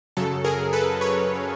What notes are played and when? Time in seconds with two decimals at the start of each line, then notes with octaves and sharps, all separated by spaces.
0.17 F#2 C#3 F#3 A4
0.44 G#4 A#4
0.73 A4 B4
1.01 B4 C#5